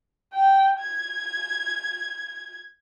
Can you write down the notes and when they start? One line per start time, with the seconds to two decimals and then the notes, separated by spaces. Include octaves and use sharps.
0.34 G5
0.80 G#6